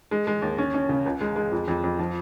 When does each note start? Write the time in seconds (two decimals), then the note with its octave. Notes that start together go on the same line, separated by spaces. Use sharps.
0.11 G#3
0.27 G#3
0.42 D#2
0.58 C#4
0.74 C#4
0.89 C#3
1.06 C#2
1.21 G#3
1.36 G#3
1.51 F2
1.68 F2
1.84 F2
1.99 F3